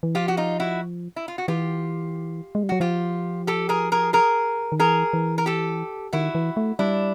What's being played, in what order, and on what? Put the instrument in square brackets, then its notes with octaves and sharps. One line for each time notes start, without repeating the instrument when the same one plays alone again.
[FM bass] E3
[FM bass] F3 [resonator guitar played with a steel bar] F4 G4
[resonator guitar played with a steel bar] F#4
D#4 F4
E4 F#4
E4
F4
F#4
[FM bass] E3 [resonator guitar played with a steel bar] F4 G4
[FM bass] G#3
G3
[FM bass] F#3 [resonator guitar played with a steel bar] F#4
[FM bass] F3 [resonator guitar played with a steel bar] F4 G4
[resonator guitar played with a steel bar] G4 A4
G#4 A#4
G#4 A#4
G#4 A#4
[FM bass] D#3
[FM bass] E3 [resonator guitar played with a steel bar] G#4 A#4
[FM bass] E3
[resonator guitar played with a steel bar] A#4
G4 A4
[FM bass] D#3 [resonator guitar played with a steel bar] E4 F#4
[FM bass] E3
A3
[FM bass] G3 [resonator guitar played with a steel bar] D4 E4